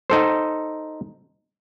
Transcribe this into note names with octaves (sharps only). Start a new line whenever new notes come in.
D#4 A4 C5